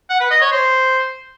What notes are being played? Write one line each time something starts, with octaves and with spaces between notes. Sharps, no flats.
F#5
B4
D#5
C#5
C5